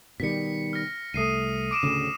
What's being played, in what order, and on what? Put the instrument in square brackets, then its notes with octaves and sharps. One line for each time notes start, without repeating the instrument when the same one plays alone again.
[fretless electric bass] B2 D#3 G3 [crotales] B6 C#7
[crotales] F6 A#6
[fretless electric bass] C2 A3 [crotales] D#6 C7 D#7
[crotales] D6 D7 E7
[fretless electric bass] D1 D2 C#3 [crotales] E7